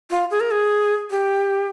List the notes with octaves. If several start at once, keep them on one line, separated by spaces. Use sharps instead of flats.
F4
G#4
A#4
G#4
G4